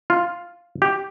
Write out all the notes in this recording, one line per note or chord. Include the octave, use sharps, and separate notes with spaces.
F4
G4